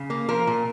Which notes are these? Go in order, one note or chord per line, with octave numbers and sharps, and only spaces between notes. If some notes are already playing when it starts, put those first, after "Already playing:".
Already playing: C#3
A#3
F3 A#4
A#2